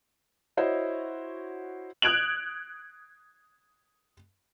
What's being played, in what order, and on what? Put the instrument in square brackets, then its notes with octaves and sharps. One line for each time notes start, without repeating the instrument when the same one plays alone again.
[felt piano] E4 F#4 C5 C#5 D#5
[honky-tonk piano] D#6 F#6 G#6 D7 F7 F#7